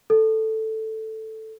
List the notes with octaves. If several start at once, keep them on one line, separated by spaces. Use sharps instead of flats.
A4